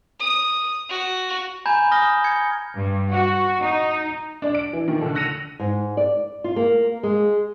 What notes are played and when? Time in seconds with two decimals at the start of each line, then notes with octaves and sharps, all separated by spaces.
0.20 D#6
0.90 F#4
1.66 G#5 A#5 B5 G6 G#6
1.91 D#6 F6 A#6 G7
2.24 G#6 C#7
2.75 G2
3.11 F#4
3.61 D#4
4.42 D4 D5
4.55 D7
4.73 E3
4.88 A#2 D#3
5.01 D3 A4
5.15 E6 F#6 A#6 C#7 D#7 F7
5.60 G#2
5.97 D5
6.44 F4
6.56 A#3
7.03 G#3